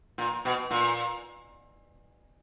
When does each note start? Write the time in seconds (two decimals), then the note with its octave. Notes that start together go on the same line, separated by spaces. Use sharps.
0.18 A#2
0.45 B2
0.71 A#2